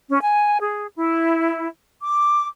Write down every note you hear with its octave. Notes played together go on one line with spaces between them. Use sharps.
C#4
G#5
G#4
E4
D6